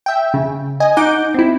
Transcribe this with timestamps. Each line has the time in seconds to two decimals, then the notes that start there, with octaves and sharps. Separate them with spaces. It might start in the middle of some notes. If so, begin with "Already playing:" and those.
0.06 E5 G5
0.34 C#3
0.80 D#5 G#5
0.97 D#4 F#5 D6 G6
1.34 C4 E4